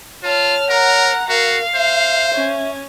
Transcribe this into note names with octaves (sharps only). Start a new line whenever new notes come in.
F4 C#5 A5 F6
A#4 F#5 A#5
F#4 A#4 F5
C5 E5
C#4